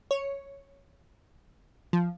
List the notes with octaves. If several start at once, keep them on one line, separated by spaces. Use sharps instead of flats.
C#5
F3